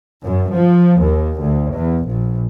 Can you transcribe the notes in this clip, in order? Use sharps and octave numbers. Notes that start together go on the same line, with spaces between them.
F#2
F3
D#2
D2
E2
A#1